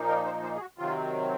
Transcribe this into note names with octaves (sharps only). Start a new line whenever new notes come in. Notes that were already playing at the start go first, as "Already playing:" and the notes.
Already playing: A#2 F3 A#3 D#4
A#4
C5
C5
G#4
F#4
C3 D#3 F#3 C4 F4